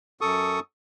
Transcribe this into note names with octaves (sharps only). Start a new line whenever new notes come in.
F#2 A4 C#6 D#6